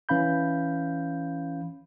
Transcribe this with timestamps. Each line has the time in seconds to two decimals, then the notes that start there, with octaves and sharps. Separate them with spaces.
0.09 E3 C#4 F5 B5 G6